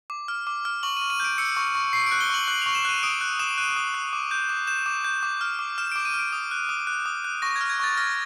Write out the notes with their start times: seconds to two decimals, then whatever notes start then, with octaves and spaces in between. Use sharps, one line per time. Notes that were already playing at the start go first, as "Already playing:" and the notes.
0.10 D6
0.28 F6
0.47 D6
0.65 F6
0.83 C#6 F#7
0.97 D#7
1.01 C#6
1.10 D#7
1.20 G6 D7
1.38 E6 C#7
1.57 C#6
1.75 C#6
1.93 C#6 C7
2.06 D7
2.12 F#6
2.20 G7
2.30 C#6 F#7
2.48 F#6 F#7
2.62 F7
2.66 C#6
2.75 E7
2.85 F#6 D#7
3.03 D#6 D7
3.21 F#6
3.39 D#6 E7
3.58 F#6 D#7
3.76 D#6
3.94 F#6
4.13 D6
4.31 G6
4.49 D6
4.67 G6 E7
4.86 D6
5.04 G6
5.23 D6
5.41 F6
5.59 D6
5.78 F6 E7
5.92 D7
5.96 D6
6.05 D#7
6.14 F6
6.19 D7
6.32 D#6
6.51 F#6
6.69 D#6
6.87 F#6
7.06 D#6
7.25 F#6
7.42 C#6 A#6
7.56 G#6
7.61 F6
7.70 G#6
7.80 C#6 A6
7.97 F6 A#6